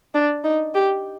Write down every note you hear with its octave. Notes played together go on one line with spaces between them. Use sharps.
D4
D#4
G4